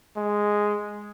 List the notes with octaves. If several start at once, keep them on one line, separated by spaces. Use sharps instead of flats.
G#3